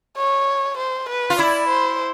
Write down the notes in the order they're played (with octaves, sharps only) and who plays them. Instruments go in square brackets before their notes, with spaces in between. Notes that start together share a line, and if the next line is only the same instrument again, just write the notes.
[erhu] C#5
C5
B4
[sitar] F4
[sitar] E4 [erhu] D5
[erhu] C5